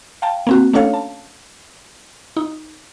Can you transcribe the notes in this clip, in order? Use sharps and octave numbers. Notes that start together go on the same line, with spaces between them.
F5 G5 A5
A#3 C4 F#4
A3 C#4 D4 A4 C#5 F5
A5
D#4